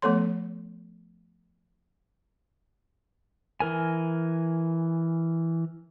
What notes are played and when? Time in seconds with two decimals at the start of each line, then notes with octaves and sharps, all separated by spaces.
0.02 F3 A3 B3 A4 C#5 C6
3.60 E3 A#4 G#5